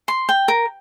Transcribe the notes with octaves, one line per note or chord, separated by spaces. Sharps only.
C6
G5
A#4